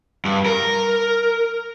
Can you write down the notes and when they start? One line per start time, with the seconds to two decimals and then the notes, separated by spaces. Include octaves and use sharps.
0.25 G2
0.46 A#4